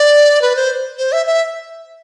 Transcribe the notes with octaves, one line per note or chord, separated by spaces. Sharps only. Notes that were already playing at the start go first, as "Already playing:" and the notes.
Already playing: D5
B4
C5
C5
E5
E5